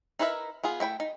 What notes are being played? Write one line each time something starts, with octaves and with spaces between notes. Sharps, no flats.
D#4 E4 A#4 B4 E5
B3 F4 G#4
A3 E4 G5 B5
D#4